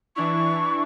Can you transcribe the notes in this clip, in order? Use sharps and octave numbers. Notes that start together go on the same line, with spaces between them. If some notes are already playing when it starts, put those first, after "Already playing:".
E3 D4 E4 C#6